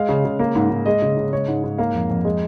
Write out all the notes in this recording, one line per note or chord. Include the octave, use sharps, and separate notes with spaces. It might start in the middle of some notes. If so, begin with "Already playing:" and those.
Already playing: G#3 F5
C#3
C#3
A#3
G#2
G#2
G#3 D#5
C#3
C#3
G#3 C#5
G#2
G#2
A#3 F5
F2
F2
G#3